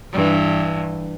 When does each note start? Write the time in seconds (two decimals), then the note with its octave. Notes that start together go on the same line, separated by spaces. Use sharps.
0.13 G2 E3